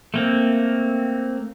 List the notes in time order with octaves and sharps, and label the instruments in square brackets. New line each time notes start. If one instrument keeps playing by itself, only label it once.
[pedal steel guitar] A3 A#3 C4